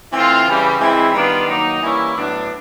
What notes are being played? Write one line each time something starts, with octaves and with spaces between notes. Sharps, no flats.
E3 A3 C4 F4
C#3 E3 G3
E3 G#3 C4 E4
D#3 G3 B3 D4 F4
D#3 F#3 A#3 D#4
E3 G3 A#3 C#4 E4
A2 F#3 B3 D4